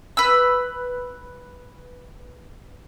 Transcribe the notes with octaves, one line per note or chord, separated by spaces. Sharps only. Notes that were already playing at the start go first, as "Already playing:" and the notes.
B4 E6